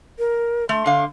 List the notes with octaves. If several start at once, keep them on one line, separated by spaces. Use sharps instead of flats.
A#4
A3 C6
D3 F5